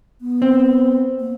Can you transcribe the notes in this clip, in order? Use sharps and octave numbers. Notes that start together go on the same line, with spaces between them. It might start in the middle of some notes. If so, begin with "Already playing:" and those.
B3
C4
A#3